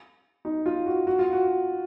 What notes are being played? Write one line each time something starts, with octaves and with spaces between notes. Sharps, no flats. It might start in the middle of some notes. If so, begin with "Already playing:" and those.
D#4
F4
F#4
F#4
F4
F#4